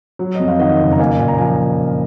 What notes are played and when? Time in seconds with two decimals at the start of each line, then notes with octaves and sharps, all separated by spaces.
0.19 F#3
0.35 F2 D#5
0.48 F5
0.59 D#3 D#5 F#5
0.80 F#1
0.92 A#5
0.99 A#3 F5 G#5
1.19 A#2 G#5
1.28 A#5
1.38 F3 G#5
1.47 A#5